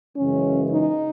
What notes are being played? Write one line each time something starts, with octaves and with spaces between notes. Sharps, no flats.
F#2 C#3 E3 G#3 C#4
D#4